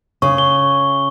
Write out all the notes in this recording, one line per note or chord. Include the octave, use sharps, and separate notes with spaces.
C#3 C#6
G7